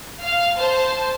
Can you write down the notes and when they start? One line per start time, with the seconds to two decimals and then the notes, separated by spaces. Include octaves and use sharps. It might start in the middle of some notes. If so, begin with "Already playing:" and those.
0.21 F5
0.57 C5 A5